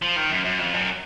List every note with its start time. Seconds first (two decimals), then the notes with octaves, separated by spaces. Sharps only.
0.02 F3
0.16 D#3
0.31 F#2
0.45 F#2
0.59 F2
0.73 F#2